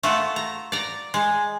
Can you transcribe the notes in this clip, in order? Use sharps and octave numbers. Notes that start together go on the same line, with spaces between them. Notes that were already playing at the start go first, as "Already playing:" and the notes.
A3 F4 F#4 A4
A#5
D5 A#5
G#3